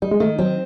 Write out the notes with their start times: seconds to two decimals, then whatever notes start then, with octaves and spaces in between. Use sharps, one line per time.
0.02 G3 D#4
0.11 G#3
0.20 D#3 A3
0.38 F#3 C4